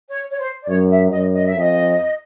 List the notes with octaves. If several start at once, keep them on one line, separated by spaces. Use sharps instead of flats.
C#5
C#5
C5
D5
F#2 C#5
E5
F#2 D#5
D#5
E5
F2 D#5